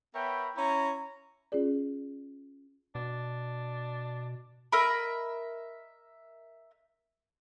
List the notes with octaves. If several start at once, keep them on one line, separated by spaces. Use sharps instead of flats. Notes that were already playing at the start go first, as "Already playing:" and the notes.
B3 A#4 C#5 E5 G5 B5
C#4 E4 C#5 A#5
C#4 F4 G#4 D5
B2 D4
A#4 D#5 E5 B5